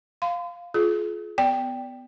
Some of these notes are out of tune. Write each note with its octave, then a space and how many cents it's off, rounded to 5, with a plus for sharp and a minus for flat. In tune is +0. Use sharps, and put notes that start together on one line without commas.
F5 +0 C6 -40
F4 +0 G#4 +35
B3 +20 D5 -15 G5 +5